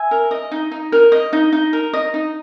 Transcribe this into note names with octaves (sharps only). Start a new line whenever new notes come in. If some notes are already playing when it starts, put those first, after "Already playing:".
Already playing: E5 G#5
A#4
D#5
D#4
D#4
A#4
D#5
D#4
D#4
A#4
D#5
D#4